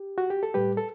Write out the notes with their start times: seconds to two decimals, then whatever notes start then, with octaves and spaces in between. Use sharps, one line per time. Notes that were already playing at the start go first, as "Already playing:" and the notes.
Already playing: G4
0.18 F#4
0.30 G4
0.43 A4
0.54 A2 G3 G4 B4
0.77 A4